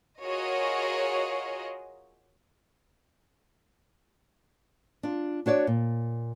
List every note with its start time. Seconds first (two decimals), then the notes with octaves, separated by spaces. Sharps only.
0.23 F4 F#4 G#4 A#4 C#5 D#5
5.03 D4 F4
5.46 D4 F#4 C#5 D5
5.67 A#2